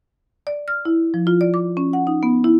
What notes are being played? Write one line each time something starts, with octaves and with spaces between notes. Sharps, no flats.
D5
F6
E4
F3
F4
D5
D6
C#4
F#5
D#4
B3
E4